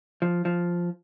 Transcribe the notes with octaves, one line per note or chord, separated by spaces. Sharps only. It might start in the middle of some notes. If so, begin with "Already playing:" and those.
F3
F3